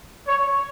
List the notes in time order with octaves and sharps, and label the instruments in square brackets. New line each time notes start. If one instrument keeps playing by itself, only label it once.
[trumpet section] C#5